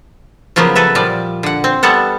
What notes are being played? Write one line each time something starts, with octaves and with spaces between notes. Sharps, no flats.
C#3 F3 F#3 A#3 B3
A4 B4 E5
A#2 F3 G3 D5
D3 F#5
C4
G3 B3 A4 F#5